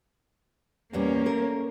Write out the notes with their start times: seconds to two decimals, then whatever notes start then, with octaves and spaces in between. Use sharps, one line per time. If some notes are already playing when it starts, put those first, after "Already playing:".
0.93 E2 A#2 G3 A#3 C#4
1.26 A3 A#4